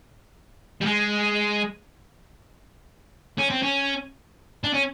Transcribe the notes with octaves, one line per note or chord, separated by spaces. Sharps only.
G3
G#3
C#4
C4
C#4
D4
C#4